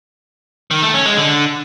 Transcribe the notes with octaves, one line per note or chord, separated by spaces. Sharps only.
D#3
A3
C#4
G#3
D3